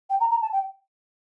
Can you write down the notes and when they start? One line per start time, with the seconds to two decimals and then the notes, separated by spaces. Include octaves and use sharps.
0.09 G5
0.20 A#5
0.30 A#5
0.41 A5
0.52 G5